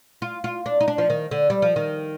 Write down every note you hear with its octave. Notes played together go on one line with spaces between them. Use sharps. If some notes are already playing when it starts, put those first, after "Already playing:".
F4
F4
D4
D#4
D4
F3
D#3
D3
G3
F3
D#3